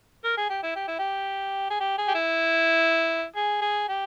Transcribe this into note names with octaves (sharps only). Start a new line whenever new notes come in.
A#4
G#4
G4
E4
G4
E4
G4
G#4
G4
G#4
G4
E4
G#4
G#4
G4